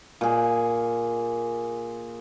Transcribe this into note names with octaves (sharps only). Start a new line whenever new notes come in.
A#2 G#4